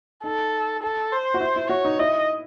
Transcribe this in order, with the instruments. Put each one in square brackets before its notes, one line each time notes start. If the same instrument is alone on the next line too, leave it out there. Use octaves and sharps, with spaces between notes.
[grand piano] D#4 [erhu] A4
[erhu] A4
C5
[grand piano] F#4
E4
E4
[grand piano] F#4 [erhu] C#5
[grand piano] D#4
[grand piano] E4 [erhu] D#5